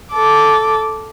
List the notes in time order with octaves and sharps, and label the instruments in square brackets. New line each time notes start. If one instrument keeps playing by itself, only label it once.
[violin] A4 D6